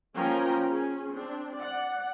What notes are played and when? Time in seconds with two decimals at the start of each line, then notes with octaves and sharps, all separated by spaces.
0.15 F3 A#3 C#4 A#4 G5 A#5
0.69 C#4 G#4
1.13 C4 D4
1.56 D5 F#5